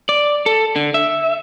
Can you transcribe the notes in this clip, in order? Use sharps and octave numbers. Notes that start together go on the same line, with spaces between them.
D5
A4
D3
E5